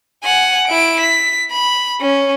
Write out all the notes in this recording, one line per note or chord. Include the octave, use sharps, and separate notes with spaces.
F#5 G#5
E4 D7
B6
B5
C#4